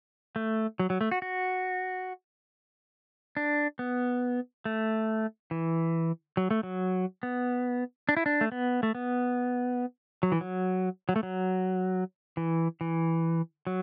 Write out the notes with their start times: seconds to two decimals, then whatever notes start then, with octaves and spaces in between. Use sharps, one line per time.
0.36 A3
0.79 F#3
0.90 F#3
1.01 A3
1.11 F#4
1.22 F#4
3.37 D4
3.79 B3
4.65 A3
5.51 E3
6.37 F#3
6.51 A3
6.63 F#3
7.23 B3
8.09 D4
8.17 E4
8.26 D4
8.41 A3
8.52 B3
8.83 A3
8.95 B3
10.23 F#3
10.32 E3
10.41 F#3
11.09 F#3
11.16 A3
11.23 F#3
12.37 E3
12.81 E3
13.67 F#3